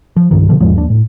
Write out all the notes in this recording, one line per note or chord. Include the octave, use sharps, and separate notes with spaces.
F3
C2 G2 D#3
B2 D3 F3
E2 G#2 F3 G#3
D#2 D4
A2